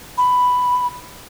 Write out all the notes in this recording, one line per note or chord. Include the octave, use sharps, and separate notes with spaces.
B5